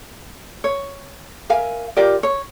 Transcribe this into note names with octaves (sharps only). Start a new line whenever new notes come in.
C#5
A#4 E5 F5 G#5
F4 G4 A#4 D5
C#5